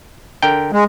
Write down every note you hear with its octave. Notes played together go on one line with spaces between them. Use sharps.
D3 A#4 G5
G#3